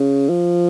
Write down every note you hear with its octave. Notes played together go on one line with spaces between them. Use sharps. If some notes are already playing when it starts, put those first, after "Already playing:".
Already playing: C#3
F3